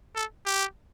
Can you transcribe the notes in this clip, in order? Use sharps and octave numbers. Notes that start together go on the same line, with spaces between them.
A4
G4